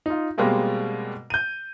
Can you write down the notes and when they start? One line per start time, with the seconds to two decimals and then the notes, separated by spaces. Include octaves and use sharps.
0.06 D#4 F4
0.38 B2 G3 G#3 A#3 C4
1.30 G6 D#7